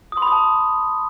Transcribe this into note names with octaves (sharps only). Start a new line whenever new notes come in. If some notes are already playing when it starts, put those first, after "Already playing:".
D#6
C6
B5
D#6
A5